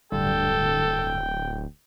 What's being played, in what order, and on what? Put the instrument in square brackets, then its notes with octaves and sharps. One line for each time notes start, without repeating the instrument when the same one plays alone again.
[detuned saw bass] D1 [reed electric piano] G2 D3 [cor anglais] A4 [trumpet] G5